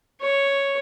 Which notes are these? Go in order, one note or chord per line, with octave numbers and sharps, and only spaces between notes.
C#5